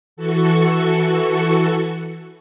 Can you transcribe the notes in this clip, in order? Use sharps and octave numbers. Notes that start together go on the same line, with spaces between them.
E3 F#4 A4 C#6